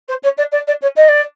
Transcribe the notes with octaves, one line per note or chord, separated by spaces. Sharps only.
C5
C#5
D5
D5
D5
C#5
D#5
D5